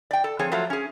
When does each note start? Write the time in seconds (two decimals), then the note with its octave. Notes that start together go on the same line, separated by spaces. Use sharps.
0.11 D5 G5
0.24 A4
0.39 F3 C4 G#4 C#5
0.52 F3 F#3 A3 F4
0.70 C#4 G#4